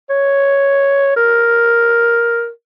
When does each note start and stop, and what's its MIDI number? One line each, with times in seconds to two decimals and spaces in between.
0.10 1.16 73
1.16 2.49 70